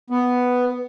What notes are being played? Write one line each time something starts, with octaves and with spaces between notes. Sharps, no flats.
B3